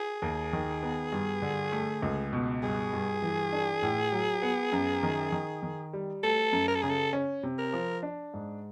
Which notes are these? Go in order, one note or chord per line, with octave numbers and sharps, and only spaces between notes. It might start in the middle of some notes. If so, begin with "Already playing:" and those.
Already playing: G#4
D#2
D#3
B3
G2
D3
A3
C#2
B2
G2 G#4
G2
E3
D4
A2
F#3
B3
F#2
D#3
D#3
D#3
G3
A3 A4
F#2
A#4
A4
C#3 G#4
A4
C#4
C3
A#4
F3
D4
G#2